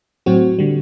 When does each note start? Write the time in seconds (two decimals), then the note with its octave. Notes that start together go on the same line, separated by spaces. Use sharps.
0.26 A2 F#3 C4 F#4
0.59 D3 G3